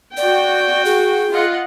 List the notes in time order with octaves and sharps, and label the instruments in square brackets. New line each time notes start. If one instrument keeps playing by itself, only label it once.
[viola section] F#4 G5 [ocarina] D5
[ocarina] G#4
[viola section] F4 D#5 F#5